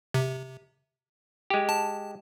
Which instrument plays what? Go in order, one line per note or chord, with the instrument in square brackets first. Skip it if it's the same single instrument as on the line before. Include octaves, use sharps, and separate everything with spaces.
[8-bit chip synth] C3
[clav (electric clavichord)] G#3 G4
[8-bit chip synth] A5